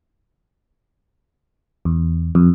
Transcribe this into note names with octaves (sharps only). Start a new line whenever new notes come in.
E2
F2